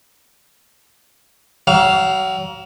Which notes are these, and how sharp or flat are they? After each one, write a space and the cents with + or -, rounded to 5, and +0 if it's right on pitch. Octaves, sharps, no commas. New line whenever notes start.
F#3 +35 F5 +0